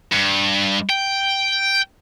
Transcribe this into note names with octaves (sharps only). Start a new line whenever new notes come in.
G2
G5